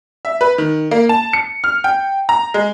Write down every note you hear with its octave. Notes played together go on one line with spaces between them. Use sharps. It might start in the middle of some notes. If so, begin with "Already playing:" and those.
E5
B4
D#3
A#3
A5
C#7
F6
G5
A#5
G#3